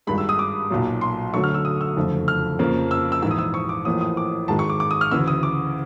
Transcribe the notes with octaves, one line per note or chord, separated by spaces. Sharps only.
G#1 G2 D#3 G#3 B5
E6
D#6
D6
B1 A#2 F#3
C6
D2 D3 F#3 A3 C#6
F6
E6
D#6
E6
F#1 F2 D3 F3 A3
F6
F2 C#3 F3 A#3
E6
E6
A#1 G#2 E3 E6
D#6
E6
C#6
D6
A1 A2 F3 A#3 D#6
D#6
D6
G#1 G#2 D#3 G#3 A5
C#6
D6
D6
D#6
F6
D2 C#3 E3 E6
D#6
D6